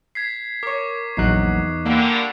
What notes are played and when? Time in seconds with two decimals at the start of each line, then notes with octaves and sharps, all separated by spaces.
0.15 G#6 B6 C7
0.63 A#4 C#5 C#6 D6
1.17 A#1 E2 F#3 D#4 F#6 C7
1.85 D3 G3 A#3